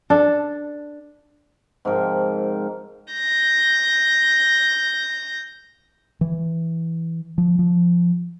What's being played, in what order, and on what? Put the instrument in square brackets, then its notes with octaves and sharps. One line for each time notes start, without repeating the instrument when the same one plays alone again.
[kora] D4 A4
[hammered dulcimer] G#2 C3 F3 A#4
[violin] G6 A#6
[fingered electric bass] E3
F3
F3